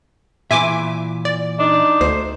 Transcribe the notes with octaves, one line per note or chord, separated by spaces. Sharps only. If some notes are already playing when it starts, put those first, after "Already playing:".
A#2 E3 E5 G#5 D6
D5
D4 D#4
D2 C5